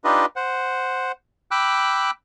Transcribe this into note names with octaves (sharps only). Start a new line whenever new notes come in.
D4 D#4 F4 G4 B4 D#5
C5 F#5
G5 B5 D6 E6 F#6